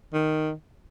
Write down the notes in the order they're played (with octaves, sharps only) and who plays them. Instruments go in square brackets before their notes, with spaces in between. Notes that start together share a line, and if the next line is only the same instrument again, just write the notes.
[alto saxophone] D#3